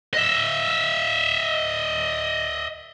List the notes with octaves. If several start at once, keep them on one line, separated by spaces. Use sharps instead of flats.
D#5 E5